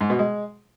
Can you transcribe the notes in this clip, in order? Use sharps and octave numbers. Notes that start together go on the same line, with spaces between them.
G#2
B2
G#3